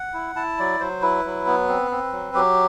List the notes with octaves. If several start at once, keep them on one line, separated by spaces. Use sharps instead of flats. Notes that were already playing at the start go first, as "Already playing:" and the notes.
Already playing: F#5
E4
E4 A5
F#3 D5
F#3 C5
E4 B4
F#3
B3
C4
C4
F#3
F#3 G4